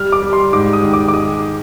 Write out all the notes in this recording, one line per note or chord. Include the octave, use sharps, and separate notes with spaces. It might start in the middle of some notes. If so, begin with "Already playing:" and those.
Already playing: G3 F6
D6
G3
C6
G#2 D6
D#6
D#3
D6
D6
G#3 D#6